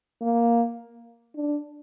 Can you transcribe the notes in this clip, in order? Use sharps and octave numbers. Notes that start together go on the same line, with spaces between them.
A#3
D4